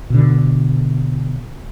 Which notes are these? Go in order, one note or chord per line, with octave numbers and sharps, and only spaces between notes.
B2 D3